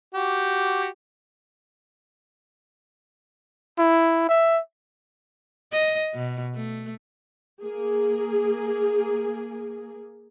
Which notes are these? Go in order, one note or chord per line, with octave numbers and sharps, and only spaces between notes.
F#4 G4
E4
E5
D#5
B2
A3
A#3 G#4